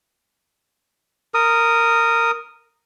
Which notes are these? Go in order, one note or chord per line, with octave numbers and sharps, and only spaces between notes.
A#4 D#6